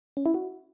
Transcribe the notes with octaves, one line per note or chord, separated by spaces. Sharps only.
C#4
E4
F#4